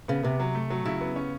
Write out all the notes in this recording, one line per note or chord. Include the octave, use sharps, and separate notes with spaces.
C#3 B3
C3 B3
F#3
A3
F#3
C#3 E4
B3
C#4